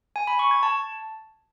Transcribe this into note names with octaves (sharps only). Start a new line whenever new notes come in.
G#5
B5
C#6
G#6
A5